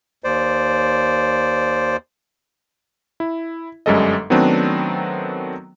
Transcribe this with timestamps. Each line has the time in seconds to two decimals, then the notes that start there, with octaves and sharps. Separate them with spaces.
0.24 D#2 C5 D5
3.20 E4
3.86 G1 F#2 G3 G#3 A4 D#5
4.30 D#3 F#3 A3 B3 C4 D4